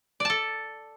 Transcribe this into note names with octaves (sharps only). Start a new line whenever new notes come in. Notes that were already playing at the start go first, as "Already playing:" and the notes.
A4 D5 A5